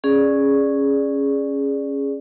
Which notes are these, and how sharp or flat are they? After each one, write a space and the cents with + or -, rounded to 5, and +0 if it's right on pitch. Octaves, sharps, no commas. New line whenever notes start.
C#4 -5 G#4 +0 D5 +0